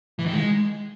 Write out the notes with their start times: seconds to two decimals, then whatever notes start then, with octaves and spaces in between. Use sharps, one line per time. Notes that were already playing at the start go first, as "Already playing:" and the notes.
0.19 E3
0.26 D#3
0.33 G#3